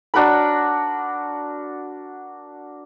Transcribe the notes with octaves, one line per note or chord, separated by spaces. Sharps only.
D4 F#4 A#4 B5